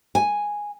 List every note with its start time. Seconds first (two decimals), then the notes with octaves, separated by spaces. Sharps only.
0.15 G#5